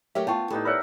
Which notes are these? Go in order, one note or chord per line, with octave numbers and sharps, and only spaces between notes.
F#3 A3 G4 A#4 C#5 E5
B3 F4 G5 A5 C#6
A2 G3 B3 D#4 A4
A#4 C#5 D5 E5 F#5 B5